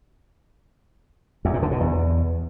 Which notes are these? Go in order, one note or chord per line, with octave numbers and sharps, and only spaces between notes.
E2
A#2
D3
B2
E2